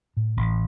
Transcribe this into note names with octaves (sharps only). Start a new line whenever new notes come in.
A2
A1